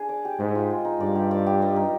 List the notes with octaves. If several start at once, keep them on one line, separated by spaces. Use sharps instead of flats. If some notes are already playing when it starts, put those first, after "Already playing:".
Already playing: D4 G#4
D5
G4
G#2 D#5
F4
G#3
D#4
G2 D5
G4
D5
G4
D#5
D#4